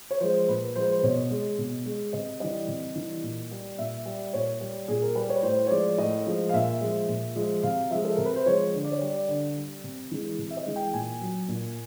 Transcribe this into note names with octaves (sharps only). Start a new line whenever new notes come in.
C#5
F3 G#3 C5
A#2 B4
F3 G#3 C5
B4
C5
B2 C#5
G#3
B2
G#3
C3 D#5
E3 G3 D#5
C3
E3 G3
A#2
G3
A#2 E5
G3
A#2 C#5
G3
A#2 G#4
A#4
G3 B4
C#5
A2 C5
C#5
F3 G#3 D5
A2 D#5
F3 G#3
F5
A#2 E5
F3 G#3
A#2
F3 G#3
C3 F5
F3 G#3 E5
A4
C3 A#4
B4
C5
F3 G#3 C#5
D3
D5
C#5
G3
D5
D3
G3
C3
E3 G#3
C3
E5
D#5
E3 G#3
G5
A#2 G#5
F#3
A#2